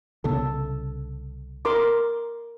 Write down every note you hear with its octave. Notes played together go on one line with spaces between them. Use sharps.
C2 C#3 B3 A4
A#4 C6 D6